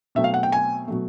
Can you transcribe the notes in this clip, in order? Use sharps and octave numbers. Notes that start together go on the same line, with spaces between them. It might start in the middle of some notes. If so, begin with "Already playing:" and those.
B2 F#3 A3 C4 E5
F5
F#5
G5
G#5
B2 F#3 A3